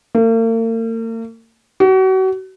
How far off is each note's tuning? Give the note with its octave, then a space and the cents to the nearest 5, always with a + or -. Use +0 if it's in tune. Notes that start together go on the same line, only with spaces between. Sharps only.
A#3 -45
F#4 +35